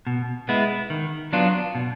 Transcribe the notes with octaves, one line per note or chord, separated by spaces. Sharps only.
B2
G#3 B3 E4
D#3
F#3 B3 D4 F4
B2